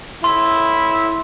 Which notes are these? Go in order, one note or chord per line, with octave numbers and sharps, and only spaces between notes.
A2 E4 C6